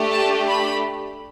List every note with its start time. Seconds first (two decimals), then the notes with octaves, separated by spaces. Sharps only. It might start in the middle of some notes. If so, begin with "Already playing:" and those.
Already playing: A3 D4 G4
0.11 A5
0.48 B5